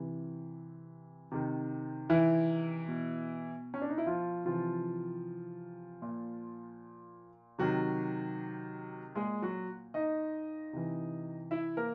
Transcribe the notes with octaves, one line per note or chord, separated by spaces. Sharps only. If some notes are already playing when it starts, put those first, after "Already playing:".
Already playing: C3 E3
C3 D#3
E3 E4
B2
C#4
D4
D#4
E4
F3 F4
C3 E3 F3 F4
A#2
C3 D#3 F#3 F#4
A#2 G#3 G#4
F#3 F#4
D#4 D#5
C3 E3
E4 E5
A#3 A#4